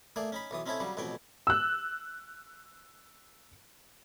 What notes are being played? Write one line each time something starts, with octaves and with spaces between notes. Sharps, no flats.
A3 A#3 G#4 D5
C#4 D#4 B5
B1 E3 D#6
C4 C#4 D#4 E4 A4 C#5
C#3 F#3 G3
A1 F2 B2 G5 G#5
E6 F#6